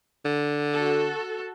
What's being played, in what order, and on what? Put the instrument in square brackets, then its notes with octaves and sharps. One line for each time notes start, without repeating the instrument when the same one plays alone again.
[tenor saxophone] D3
[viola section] F#4 A4